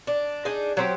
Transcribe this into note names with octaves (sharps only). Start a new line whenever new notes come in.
D4
D4 D#4 G#4
F#3 C4 G4